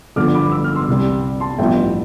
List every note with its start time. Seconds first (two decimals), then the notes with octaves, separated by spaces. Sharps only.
0.16 G1 G2 D3 F3 D6 F6
0.34 B5 D6
0.52 E6
0.64 F6
0.75 C6 E6
0.88 C2 C3 G3
1.40 A5 C6
1.58 A1 G2 F3 B3 D4 E5 G5